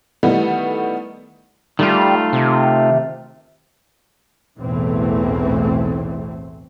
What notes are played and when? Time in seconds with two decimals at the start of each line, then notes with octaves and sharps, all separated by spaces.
0.23 D#3 G3 A3 B3 D#4 E4
1.79 D#3 G3 A3 F4
2.33 C3
4.60 B1 E2 A2 E3 A3 C4